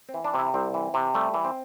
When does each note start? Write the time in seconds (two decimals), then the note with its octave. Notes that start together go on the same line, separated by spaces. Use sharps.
0.09 C4
0.14 E3
0.24 D4
0.34 C3 E4
0.54 C2 C4
0.74 E3
0.94 C3
1.14 G3 A3
1.34 E3
1.45 C4